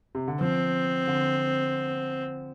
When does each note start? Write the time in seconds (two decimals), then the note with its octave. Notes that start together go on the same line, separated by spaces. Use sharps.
0.15 C3
0.28 D3
0.40 F3 C4
1.07 D3